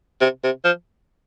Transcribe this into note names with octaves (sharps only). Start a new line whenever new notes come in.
C3
C3
F3